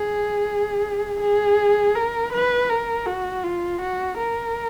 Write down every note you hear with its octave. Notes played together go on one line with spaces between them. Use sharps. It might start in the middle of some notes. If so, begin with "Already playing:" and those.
Already playing: G#4
G#4
A#4
B4
A#4
F#4
F4
F#4
A#4